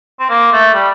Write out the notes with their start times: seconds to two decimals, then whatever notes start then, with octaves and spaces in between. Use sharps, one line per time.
0.20 C4
0.29 A#3
0.52 A3
0.74 G3